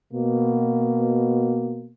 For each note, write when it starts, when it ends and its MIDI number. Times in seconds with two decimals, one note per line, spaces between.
0.13 1.92 47
0.13 1.92 58